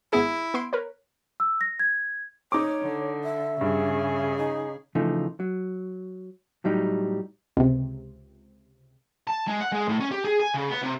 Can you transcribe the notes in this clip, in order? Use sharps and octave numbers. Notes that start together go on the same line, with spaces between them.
G#1 B3 E4 G#4
B3 C6 D7
A#4 B4 C#5
E6
A#6
G#6
D#4 C#5 D6
D3
E5
G2 C#3 G#4
D#4
C#3 E3 F3 A3 D#4
F#3
A2 F#3 G3 D#4
C#2 C3
A5
G#3
F#5
G#3
A2
C#4
G4
G#4
G#5
C#3
B3
C3